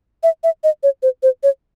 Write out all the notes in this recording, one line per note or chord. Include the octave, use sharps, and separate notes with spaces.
E5
E5
D#5
C#5
C5
C5
C#5